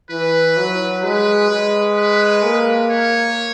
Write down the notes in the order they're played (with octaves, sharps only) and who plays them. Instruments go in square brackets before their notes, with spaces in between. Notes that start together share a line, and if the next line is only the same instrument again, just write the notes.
[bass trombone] E3 [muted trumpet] B4
[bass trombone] F#3
[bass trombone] G#3 [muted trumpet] B4
[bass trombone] G#3
[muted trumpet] B4
[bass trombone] A#3
[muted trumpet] C#5